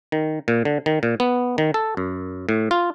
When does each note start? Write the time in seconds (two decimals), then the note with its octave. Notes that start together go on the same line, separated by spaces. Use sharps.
0.12 D#3
0.48 A#2
0.65 D3
0.86 D#3
1.03 A#2
1.20 B3
1.58 D#3
1.74 A4
1.97 F#2
2.49 A2
2.71 F4